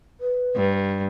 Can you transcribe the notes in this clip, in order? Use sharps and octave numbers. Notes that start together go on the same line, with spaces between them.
B4
G2